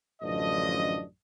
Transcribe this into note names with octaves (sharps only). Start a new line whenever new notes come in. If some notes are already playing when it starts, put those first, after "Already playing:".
A1 F#2 D3 F3 D4 D#5